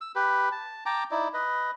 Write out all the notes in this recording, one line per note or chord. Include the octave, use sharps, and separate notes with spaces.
E6
G4 B4
A5
G5 A5 A#5 D6
D#4 E4 D5
B4 D#5